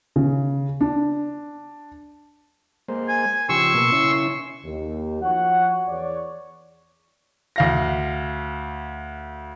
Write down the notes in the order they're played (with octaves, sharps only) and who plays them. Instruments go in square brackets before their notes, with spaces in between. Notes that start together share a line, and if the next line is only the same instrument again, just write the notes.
[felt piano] C#3
D4
[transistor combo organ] G#3 A#3 C5
[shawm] G#5
[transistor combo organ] C#3 F3 G4 [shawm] C6 [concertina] C#6 E6
[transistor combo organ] B2 A#3
C#3 C#4 E4
[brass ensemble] D#2
F3 F#4 C#5 F#5
E2 C#5 D5
[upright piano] D2 F5 A#6